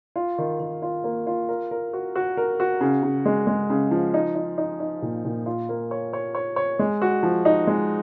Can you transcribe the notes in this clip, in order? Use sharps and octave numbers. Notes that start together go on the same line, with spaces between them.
F4
D#3
D#3
F4
A#3
F4
A#4
A#4
F#4
F#4
A#4
F#4
C#3
C#3
G#3
G#3
C#3
F3
D#4
D#4
D#4
D#4
A#2
A#2
F4
A#3
C#5
C#5
C#5
C#5
G#3
F#4
F3
D#4
G#3